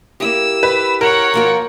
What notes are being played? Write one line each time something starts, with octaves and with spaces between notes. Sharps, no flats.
A#3 E4 G4 E6
B4
A#4 C#5 F#5
F3 A#3 F#4